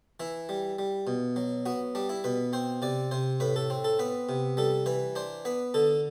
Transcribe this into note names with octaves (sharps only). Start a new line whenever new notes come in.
E3 E4
G3
G3
B2
F#3
B3 F#4
G3 D4
E4
B2 B4
C4 C5
C3 D5
C3 C5
A2 B4
A4
C4
A4
B3 B4
C3
G3 A4
E3 B4
D4 C5
B3 B4
D3 A4